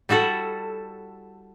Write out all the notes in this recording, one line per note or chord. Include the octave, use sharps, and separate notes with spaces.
G3 E4 F#4 A4